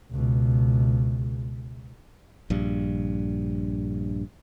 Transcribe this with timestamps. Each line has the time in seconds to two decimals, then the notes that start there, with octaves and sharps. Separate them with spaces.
0.11 C#2 B2
2.50 A#1 G2